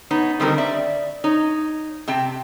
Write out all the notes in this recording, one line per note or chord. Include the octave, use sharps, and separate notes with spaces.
B3 D#4 C#5
D3 D#3 G3 C4 D#4 A#4
D5 E5
D#4 C#5
C3 C4 G5 A5